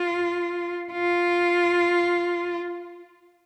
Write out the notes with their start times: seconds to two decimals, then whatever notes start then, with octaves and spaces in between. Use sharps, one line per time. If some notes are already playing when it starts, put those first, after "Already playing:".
Already playing: F4
0.92 F4